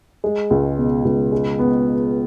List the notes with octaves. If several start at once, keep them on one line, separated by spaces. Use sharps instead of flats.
G#3
C#2
B2
C#2
G#3
B3